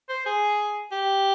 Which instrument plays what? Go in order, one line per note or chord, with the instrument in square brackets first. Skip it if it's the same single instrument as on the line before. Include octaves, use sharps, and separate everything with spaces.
[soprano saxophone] C5
G#4
G4